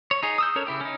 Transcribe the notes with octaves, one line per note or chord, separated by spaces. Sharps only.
C#5
D#4 G#4
D#6 E6 G6
C#4 A4 A#4 C#5
C#3 E4 G4
C#4 D#4